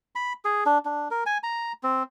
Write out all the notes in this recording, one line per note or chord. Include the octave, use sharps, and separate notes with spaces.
B5
G#4
D4
D4
A#4
G#5
A#5
C4